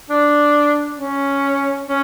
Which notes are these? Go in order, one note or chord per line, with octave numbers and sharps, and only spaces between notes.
D4
C#4
C#4